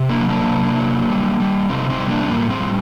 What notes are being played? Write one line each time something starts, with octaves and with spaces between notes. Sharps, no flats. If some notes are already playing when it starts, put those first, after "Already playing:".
Already playing: C3
A#3 D4
F#3
A#3 D4
C3
F#3
G3
G3
C3 C4 D#4
C4 D#4
G3
A#3 D4
C4
A2 A#3
C4
G3